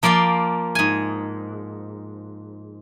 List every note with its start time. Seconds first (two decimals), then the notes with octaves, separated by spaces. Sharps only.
0.03 F3 A#3 D5 F5 C6
0.75 G#2 G#5